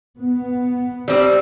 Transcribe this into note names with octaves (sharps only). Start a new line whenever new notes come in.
B3
G3 C4